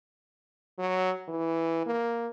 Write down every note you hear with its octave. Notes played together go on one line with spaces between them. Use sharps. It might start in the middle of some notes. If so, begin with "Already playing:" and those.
F#3
E3
A#3